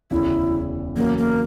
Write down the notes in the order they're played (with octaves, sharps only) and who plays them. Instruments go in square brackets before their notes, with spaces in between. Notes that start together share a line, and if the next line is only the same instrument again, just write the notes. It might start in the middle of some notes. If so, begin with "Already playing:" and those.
[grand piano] E1 D2 C#3 [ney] E4
[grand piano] E2 C#3 F#3 [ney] A#3
[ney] A#3